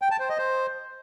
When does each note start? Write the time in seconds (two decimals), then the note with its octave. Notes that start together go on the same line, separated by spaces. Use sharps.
0.02 G5
0.11 A5
0.20 C5
0.29 D#5
0.38 C5